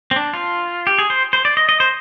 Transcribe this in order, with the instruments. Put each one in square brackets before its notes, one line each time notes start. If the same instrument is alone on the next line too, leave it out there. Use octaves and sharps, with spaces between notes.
[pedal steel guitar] C4
D4
F4
G4
G#4
C5
C5
D5
D#5
D#5
C5